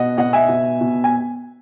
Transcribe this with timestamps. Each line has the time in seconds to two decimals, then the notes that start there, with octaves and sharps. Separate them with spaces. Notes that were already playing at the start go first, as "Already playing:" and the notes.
Already playing: B2 D#5 F#5
0.18 B2 D#5 F#5
0.33 E5 G#5
0.49 B2
0.81 B2
1.04 G#5